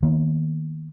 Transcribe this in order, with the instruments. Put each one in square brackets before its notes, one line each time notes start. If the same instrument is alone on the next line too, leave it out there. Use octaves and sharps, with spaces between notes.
[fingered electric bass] D#3 A#3 B3